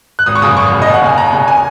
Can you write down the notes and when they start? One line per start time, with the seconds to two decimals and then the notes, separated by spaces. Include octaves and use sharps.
0.19 F#6
0.26 G#1 D#6
0.35 C#6
0.42 F#2 C#3 D#6
0.57 G#1 C#6
0.72 F#2 C#3
0.82 D#5
0.87 D#2
0.94 F#5
1.02 C#3 G#5
1.17 D#2 A#5
1.33 C#3
1.48 G#5